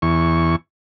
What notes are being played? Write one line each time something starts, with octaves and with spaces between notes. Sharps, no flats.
E2 C#6